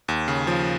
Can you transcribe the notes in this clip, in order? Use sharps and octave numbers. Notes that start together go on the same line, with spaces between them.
D#2
C#3
F3